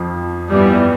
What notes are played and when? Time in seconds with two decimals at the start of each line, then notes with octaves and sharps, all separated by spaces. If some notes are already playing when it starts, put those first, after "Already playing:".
Already playing: F2 F3
0.51 G2 E3 G3 B3